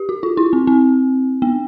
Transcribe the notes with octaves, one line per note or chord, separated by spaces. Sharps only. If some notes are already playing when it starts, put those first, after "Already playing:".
Already playing: G4
F#4
F4
E4
C4
C4
B3